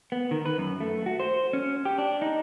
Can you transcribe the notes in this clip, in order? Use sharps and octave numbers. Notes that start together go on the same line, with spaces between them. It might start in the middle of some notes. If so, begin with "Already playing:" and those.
B3
D#3
B4
F#2
A3
F#4
C5
C#4
G4
D4
D#4